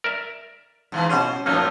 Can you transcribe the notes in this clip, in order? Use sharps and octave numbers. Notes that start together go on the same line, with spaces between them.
A#4 D5 E5
G#2 E3
B2 G3 C#4 G#4 C5
F#2 A2 F3 A#3 D#4